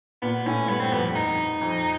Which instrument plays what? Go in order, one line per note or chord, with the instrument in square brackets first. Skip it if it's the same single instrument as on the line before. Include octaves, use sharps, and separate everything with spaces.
[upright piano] A#2 [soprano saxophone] B3
[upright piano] A2 [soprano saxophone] C#4
[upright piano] G2 [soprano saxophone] B3
[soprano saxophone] C4
[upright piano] F2 [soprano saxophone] B3
[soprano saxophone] D#4
[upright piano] F2